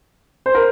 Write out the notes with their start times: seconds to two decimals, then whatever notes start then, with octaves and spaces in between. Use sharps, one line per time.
0.46 C5
0.55 A#4